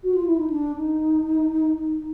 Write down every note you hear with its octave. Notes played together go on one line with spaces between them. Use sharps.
F#4
F4
E4
D#4
D4
D#4